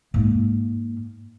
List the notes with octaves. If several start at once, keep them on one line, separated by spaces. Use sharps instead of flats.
G#2 A#3